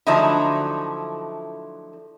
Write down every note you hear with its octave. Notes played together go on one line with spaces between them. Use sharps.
D3 F3 F#3 A3 D#4 E4